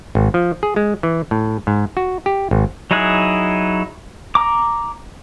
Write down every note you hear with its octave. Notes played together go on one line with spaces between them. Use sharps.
G#1
F3
G#4
G#3
E3
A2
G#2
F#4
G4
G#1
F#3 D#4 E4 G#4 F#6
A#5 D6